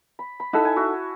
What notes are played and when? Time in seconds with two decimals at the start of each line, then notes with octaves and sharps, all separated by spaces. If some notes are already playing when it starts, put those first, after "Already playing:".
0.19 B5
0.40 B5
0.53 D#4 E4 A4 F#5 A5
0.65 G#5
0.76 F#4 E5